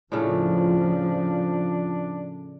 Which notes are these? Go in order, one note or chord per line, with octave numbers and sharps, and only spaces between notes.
A2 C#3 F3 A3 D4